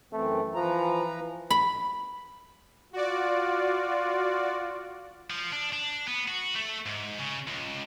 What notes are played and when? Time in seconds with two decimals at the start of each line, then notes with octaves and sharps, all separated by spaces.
0.13 F#2 E3 A3 C4
0.55 E3 F3 B4 A#5
1.50 B5
2.93 F4 F#4 D5
5.30 F3
5.52 D4
5.73 D4
6.08 B3
6.28 F#4
6.55 A3
6.86 G#2
7.19 C#3
7.47 C#2